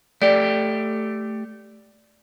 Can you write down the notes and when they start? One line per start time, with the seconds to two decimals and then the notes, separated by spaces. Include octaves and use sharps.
0.22 A3 G4 D5